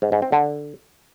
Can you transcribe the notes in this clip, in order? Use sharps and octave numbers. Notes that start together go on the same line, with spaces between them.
G#2
G#2
C4
D3